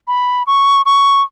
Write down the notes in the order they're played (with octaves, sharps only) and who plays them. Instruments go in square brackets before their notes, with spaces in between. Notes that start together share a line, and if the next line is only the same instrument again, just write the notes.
[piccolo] B5
C#6
C#6